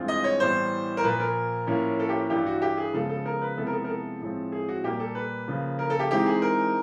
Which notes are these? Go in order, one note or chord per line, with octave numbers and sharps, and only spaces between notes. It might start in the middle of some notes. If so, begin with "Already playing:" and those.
Already playing: G2 E3 G#3 C4 F4
D#5
C#5
A2 E3 G3 B3 C5
A#4
A#2 F3 A#3 B4
A#4
A2 F3 A#3 C#4
A4
G4
G2 E3 G3 G4
F#4
G4
G#4
C#3 F3 G#3 B3 A4
A4
A#4
B4
C3 F3 G#3 B3 E4 A4
A#4
A4
A#4
A4
A2 F3 G#3 C4
G#4
F#4
A#2 G3 A#3 G4
A4
B4
C#3 F3 A#3
A#4
A4
G4
E3 G#3 C4 D#4 G4
G#4
A#4